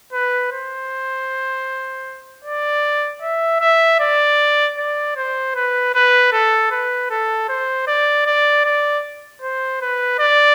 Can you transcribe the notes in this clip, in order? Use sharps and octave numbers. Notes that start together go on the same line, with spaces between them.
B4
C5
D5
E5
E5
D5
D5
C5
B4
B4
A4
B4
A4
C5
D5
D5
D5
C5
B4
D5